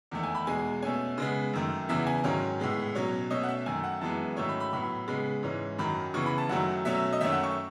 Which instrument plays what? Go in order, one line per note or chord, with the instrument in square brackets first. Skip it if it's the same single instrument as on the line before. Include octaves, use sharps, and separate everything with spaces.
[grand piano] E2 D#3 A3
G#5
B5
E2 B2 G#3 G#5
B2 A3 C#4 G#5
C#3 G#3 B3
F#2 D#3 A3
E2 C#3 E3 B3 E5
G#5
G#2 D#3 F#3 C#4
A2 G#3 B3
B2 F#3 C#4 C#5
B2 A3 C#4 D#5
F#5
E5
F#2 D#3 A3 G#5
F#5
F#2 E3 G#3 B3 A5
G#2 D#3 F#3 A3 C#4 C#6
B5
B5
A2 F#3 B3 B5
C#3 G#3 B3
G#2 E3 G#3 C#4
F#2 D#3 F#3 B5
C#3 E3 B3 C#6
B5
A5
F#2 D#3 F#3 A3 F#5
B2 F#3 A3 C#4 E5
D#5
F#2 D#3 A3 C#4 E5
F#5
C#6